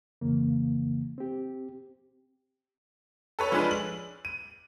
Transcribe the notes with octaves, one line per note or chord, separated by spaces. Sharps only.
F2 C#3 E3 A#3
C4 G4
A4 B4 C#5 E6
F3 G#3 C#4 D4 G#4 B4
F#7
D#7